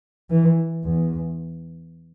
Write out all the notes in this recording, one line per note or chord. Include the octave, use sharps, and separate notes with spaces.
E3
E2